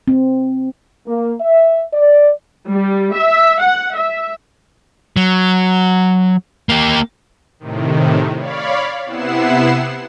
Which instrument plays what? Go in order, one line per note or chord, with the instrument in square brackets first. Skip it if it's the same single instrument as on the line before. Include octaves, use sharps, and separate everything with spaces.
[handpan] C4
[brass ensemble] A#3
E5
D5
[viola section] G3
E5
F#5
E5
[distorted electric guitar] F#3
A#3 G4
[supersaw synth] A2 C3 D#3
C#5 D5 F5 B5
C3 B3 E4 F#5 C7 E7